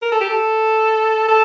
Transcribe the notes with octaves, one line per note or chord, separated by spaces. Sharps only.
A#4
A4
G4
A4
A4